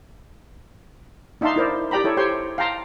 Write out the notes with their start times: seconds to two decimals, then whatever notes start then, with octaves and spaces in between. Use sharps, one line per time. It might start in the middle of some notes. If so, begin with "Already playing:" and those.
1.41 D4 D#4 E5 F5 A5 C6
1.56 E4 A#4 C5 D5
1.91 G4 D5 G5 A#5 B5
2.04 E4 A4 C#5
2.17 G4 C5 C#5 G5 C6
2.58 F5 G5 A5 A#5 C6